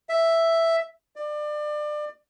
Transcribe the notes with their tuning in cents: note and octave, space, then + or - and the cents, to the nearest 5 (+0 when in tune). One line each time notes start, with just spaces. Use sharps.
E5 +5
D5 +30